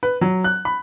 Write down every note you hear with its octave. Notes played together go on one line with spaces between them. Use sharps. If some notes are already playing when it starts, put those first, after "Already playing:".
B4
F#3
F#6
B5